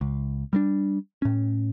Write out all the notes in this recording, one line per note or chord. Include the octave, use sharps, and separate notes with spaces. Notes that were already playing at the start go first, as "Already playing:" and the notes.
C#2
G3 G#3 D4
A2 C#4